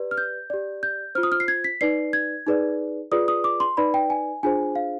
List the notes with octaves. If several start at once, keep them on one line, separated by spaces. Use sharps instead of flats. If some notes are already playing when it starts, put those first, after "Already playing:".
Already playing: G4 B4 D5
F6
G6
G4 D5
G6
F4 C5 F6
D#6
F6
C7
G#6
B6
D#4 B4 D5 C7
G#6
D#4 G#4 B4 D5
F4 G#4 B4 D5 D#6
D#6
D6
C6
D#4 B4 D5 B5
G5
G#5
D4 F4 G#4 C5 G#5
F5